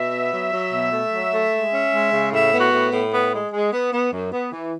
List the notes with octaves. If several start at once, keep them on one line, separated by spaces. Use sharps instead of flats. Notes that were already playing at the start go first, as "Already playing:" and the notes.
Already playing: B2 E5
B3
F#3
F#3
B2
A3
F#3
A3
G#3
C#4
G#3
C#3
A2 E5
B3
F#4
A2
A2
B3
G#3
G#3
B3
B3
F#2
B3
E3